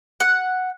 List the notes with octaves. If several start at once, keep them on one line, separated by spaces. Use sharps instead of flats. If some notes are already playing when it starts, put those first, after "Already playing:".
F#5